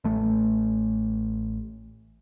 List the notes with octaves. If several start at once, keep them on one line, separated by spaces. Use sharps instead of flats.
A1 A3